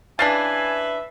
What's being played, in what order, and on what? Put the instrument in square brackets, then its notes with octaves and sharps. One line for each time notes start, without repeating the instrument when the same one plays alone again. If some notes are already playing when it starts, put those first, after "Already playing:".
[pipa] C#3 E3 D4 [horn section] B4 E5 [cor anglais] G#5 [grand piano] A6 C7